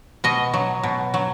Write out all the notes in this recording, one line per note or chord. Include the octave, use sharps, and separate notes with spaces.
B2 D#5
F#3
B2
F#3